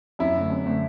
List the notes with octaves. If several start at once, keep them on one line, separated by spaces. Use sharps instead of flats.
F#2 E4
D3 A3
F#2
D3 A3